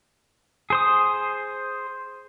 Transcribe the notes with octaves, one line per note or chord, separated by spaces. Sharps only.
G#4 C5 D#6